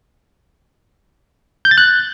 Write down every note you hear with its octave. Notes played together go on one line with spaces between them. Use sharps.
G6
A6
F#6